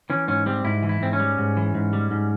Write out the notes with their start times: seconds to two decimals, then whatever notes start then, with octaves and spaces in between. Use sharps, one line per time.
0.10 E3 C#4
0.28 G#2 C#4
0.46 G3 C4
0.64 G#2 E4
0.83 E3
0.89 E4
1.01 G#2 C4
1.13 C#4
1.20 G3
1.38 G#2
1.57 E3
1.75 G#2
1.93 G3
2.11 G#2